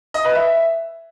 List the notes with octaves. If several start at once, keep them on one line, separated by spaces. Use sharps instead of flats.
D#5
B4
E5